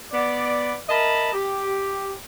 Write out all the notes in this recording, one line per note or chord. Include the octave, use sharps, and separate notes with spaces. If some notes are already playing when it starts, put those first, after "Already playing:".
B3 D5
A#4 D#5 E5 A5 B5
G4